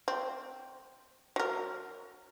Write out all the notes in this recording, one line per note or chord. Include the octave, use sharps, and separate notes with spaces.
C4
F#3 A#4